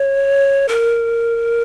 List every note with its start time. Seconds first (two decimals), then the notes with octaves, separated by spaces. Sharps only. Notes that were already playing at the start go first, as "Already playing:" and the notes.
Already playing: C#5
0.68 A#4